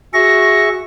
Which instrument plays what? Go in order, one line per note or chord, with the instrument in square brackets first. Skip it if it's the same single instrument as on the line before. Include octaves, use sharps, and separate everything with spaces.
[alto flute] F#4 [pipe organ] G#4 E5 C#6 [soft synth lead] A#6